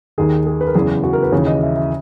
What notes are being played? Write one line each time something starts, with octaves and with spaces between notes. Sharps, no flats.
D#2 D#3 G#4
G#4
B4
A#4
F#1 E2 C#3 E3 G#4
G#4
F#4
A#4
B4
D#2 C#3 E3 C#5
D#5
E5
E5